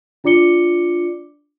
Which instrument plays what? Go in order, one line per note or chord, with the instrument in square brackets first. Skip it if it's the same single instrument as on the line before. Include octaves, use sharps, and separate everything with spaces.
[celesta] D4 F4 D5 D6 C#7 G7